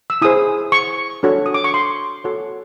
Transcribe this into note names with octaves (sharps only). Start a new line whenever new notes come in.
E6
E4 G#4 C5 D#6
C#6
D4 F#4 A4 C#5
D#6
D6
C#6
C6
F#4 A4 C#5